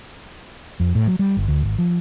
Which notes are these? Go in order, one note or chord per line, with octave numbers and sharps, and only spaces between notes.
F2
A2
F#3
G3
G1
D2
G#1
F3